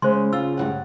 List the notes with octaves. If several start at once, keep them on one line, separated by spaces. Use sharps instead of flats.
C#3 G#3 C5 C6
F4 E6
G2 E3 F#5